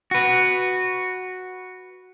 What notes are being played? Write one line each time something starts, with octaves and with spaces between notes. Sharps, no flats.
F#4 B4